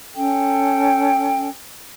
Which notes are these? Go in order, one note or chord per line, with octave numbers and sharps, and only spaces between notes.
C#4 A4 G5